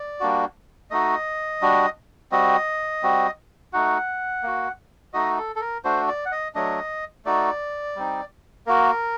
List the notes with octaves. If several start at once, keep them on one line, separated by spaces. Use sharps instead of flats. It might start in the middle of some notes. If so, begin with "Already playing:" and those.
Already playing: D5
G3 A#3 D4 F#4
A3 D#4 F#4 D#5
G3 D4 F#4
G3 C4 F#4 D#5
G3 C4 F#4
A3 D#4 F#4 F#5
A#3 F#4
A3 D#4 F#4 D#5
A4
A4
A#4
A3 D4 F#4 C5
D5
F#5
D#5
F#3 A3 D4 D#5
A3 D#4 F#4 D5
G3 C4 D#4
A#3 F#4 A#4